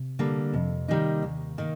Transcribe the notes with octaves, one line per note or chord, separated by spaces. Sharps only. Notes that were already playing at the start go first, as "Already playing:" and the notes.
Already playing: C3
D3 G3 A#3
F2 C3
D#3 G3 A#3 D#4
D#2
D#3 A#3